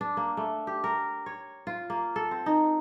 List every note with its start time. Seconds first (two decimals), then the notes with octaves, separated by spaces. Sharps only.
0.01 D4
0.17 A#3
0.37 A3
0.67 G4
0.84 A#4
1.26 C#5
1.67 F4
1.90 A#3
2.16 A4
2.31 C4
2.46 D#4